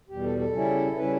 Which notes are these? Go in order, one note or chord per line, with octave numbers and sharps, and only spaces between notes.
E2 B2 G3 G4
A4
A4
C#3 G3 C#4 E4
C#3 G3 C#4 E4 B4